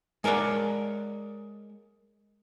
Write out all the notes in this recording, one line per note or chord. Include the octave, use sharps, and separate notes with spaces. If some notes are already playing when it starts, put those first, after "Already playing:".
G#3 A#4 C#5 D5 F#5